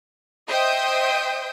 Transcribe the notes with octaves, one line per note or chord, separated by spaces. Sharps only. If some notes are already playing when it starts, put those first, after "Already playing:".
C5 D#5 E5 G5 D#6 G6